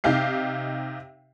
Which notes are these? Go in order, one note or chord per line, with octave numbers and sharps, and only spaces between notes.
C3 D#4 G4 F5 C7